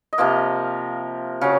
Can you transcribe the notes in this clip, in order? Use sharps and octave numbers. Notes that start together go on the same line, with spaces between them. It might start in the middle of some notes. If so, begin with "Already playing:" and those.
D#5
C3 F3 A#3 F5
C#3 F#3 F5